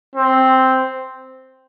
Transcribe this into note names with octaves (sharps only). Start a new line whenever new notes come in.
C4